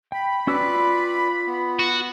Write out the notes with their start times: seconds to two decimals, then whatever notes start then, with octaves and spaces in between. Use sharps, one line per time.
0.12 G5 B5
0.47 C#4 F#4 B4 D5 E6
0.61 F4
1.47 B3
1.79 F#4